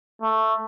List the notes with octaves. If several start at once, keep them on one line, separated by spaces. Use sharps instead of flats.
A3